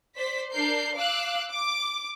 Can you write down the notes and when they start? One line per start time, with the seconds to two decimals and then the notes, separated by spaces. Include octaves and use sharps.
0.17 C5 D5 B6
0.52 D4 A#4 G6 C7
0.95 F5 D6 E6 F#6
1.52 D6